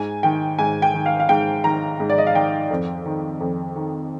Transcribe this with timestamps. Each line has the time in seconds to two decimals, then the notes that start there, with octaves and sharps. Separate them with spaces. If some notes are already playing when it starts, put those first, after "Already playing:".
Already playing: G#2 G#5
0.23 D#3 G5
0.59 G#2 G#5
0.82 G5
0.94 D#3
1.06 F5
1.20 F5
1.29 G#2 G5
1.64 D#3 A#5
2.00 G#2
2.10 D5
2.18 D#5
2.27 F5
2.34 D#3 G5
2.71 F2
3.06 D#3
3.40 F2
3.76 D#3